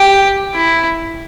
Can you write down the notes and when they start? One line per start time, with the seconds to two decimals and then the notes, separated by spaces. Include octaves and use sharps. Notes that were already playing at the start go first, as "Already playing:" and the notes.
Already playing: G4
0.54 E4